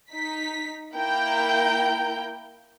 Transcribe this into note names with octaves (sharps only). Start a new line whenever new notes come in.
D#4 B6
A#3 E4 A#4 G5 G6